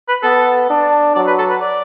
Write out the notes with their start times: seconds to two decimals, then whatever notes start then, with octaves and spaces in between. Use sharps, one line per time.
0.08 B4
0.23 B3 A4
0.70 D4
1.15 F#3 D5
1.27 B4
1.39 A4
1.50 B4
1.61 D5